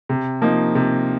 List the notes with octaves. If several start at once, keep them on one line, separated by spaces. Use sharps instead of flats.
C3
F3 A#3 D#4
C3